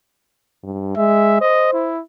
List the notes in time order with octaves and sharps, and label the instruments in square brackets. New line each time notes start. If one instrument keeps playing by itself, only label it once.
[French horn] G2
[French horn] G#3 [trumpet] E5
[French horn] C5 [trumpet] D#5
[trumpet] E4